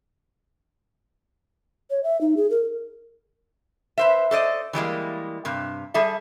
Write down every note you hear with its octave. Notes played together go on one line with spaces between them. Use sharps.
C#5
E5
D#4
G#4
A#4
B4 C5 E5
A4 C5 D5 D#5
E3 G3 G#3 A#3
G2 C3
G3 G#4 A4 E5